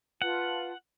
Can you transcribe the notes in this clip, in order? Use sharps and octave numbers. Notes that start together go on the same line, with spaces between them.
F4 B4 F#5 A5